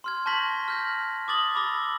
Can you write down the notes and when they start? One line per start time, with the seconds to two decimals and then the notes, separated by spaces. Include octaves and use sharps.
0.04 C6 F6 G#6
0.26 A5 C#6 G6 A#6 B6 F#7
0.68 F6 G6 A#6
1.28 D6 D#6 A6 F#7
1.55 B5 D6 E6 A#6 G7